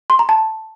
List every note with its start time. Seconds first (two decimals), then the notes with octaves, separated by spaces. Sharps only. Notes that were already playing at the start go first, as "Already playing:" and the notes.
0.10 C6
0.19 A#5
0.29 A5